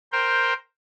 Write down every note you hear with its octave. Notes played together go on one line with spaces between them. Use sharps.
A#4 C5 G5